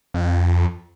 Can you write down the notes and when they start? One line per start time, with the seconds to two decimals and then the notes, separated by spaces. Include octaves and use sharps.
0.14 F2